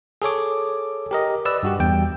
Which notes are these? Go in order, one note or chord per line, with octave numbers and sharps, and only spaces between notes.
G#4 A4 C#5 D6
G4 A#4 D#5
B4 D5 E6
G2 F#4 G4
E2 G3 G5